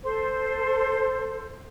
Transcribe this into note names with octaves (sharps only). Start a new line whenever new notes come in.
A4 C5 C6